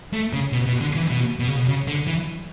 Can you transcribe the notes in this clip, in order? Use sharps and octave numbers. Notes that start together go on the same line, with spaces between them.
A3
C#3
B2
B2
D3
E3
B2
B2
C#3
B2
C#3
D3
E3